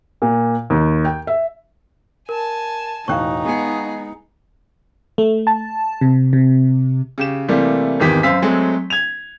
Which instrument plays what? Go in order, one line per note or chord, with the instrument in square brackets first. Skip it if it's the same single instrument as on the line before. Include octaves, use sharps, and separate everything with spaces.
[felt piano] A#2
D#2
G5
E5
[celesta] A#4 [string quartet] G#5 A5
[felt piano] E1 A2 F#6 [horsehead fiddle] D#4 [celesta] F5 G5 C#6
[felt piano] G#3 C#7 [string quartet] B3 G#4
[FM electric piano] A3
A5
C3
C3
[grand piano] C#3 G4 E7
C3 E3 G3 A3 A#3
G#1 E2 D#3 G4 B6
F#2 C5 F5 E6 B6
F#3 G#3 A3 C4
G#6 F7